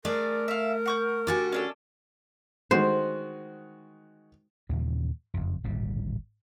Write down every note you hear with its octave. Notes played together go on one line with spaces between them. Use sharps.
A3 D4 G#4 A#4 D5
E5 F5
F#5 C#6 G6
D3 F#4 G4 G#5 A5 D6
C#4 D4 A4
D#3 G#3 F#4 C5
D#2 A#2 C#3 E3
F#1 F2
D1 G#1 A#2 G3